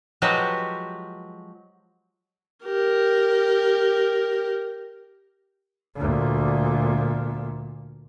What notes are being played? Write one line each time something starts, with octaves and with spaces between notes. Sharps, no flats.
F3 F#3 G#3 F#4 G4 B4
G4 A#4
D2 A#2